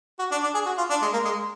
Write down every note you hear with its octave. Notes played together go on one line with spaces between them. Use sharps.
F#4
D4
D4
G#4
F#4
F4
D4
G#3
A#3
G#3